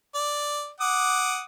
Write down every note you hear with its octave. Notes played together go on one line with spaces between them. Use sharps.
D5
F#5 D6 D#6